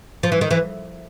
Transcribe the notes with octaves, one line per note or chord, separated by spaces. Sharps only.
F3
E3
D#3
E3